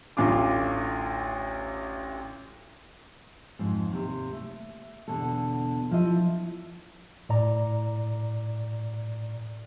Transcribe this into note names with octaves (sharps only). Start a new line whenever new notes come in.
A1 D2 F4 D6
F2 G#2
D#2 C3
A3
E2 B2 D3 A4
F3 E4 D#5
A2 D5 A#5